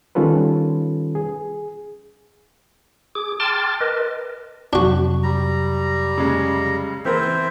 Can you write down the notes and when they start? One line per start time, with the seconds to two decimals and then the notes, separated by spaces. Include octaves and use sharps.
0.15 D#3 G3 C#4 F4 A4 B4
1.15 G#4
3.15 G#4 D6
3.40 G5 A5 C6 D6 F6 A6
3.80 A#4 B4 D#5
4.73 F2 C3 F#3 D4 F#4
5.23 G3 A#5
6.18 C#3 G#3
7.05 E3 C4 A#4 C5 E5